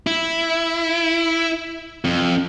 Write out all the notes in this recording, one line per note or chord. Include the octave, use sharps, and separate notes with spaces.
E4
F2